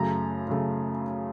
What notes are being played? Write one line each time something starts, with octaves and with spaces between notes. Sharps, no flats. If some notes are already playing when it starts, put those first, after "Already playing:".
Already playing: F#2 C#3 A3 A#5
F#2 C#3 A3